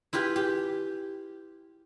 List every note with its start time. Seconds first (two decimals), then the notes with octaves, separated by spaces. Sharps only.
0.13 E4 F4 G4 B4
0.36 G4